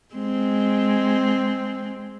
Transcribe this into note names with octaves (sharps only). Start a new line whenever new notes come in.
G#3 C4